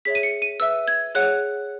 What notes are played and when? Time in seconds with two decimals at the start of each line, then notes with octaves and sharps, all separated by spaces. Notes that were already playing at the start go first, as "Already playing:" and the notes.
0.05 G#4 C#5 E5 B6
0.15 D#7
0.23 C#7
0.42 D#7
0.60 B4 E5 E6
0.88 G#6
1.15 G#4 C#5 F#5 F#6